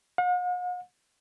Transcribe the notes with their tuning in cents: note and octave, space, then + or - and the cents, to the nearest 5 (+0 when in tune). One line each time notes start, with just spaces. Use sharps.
F#5 -45